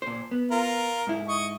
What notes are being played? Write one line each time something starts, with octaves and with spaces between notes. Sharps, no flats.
A#2 C5
B3
F4 A#4
G#2 E4
D#5 C#6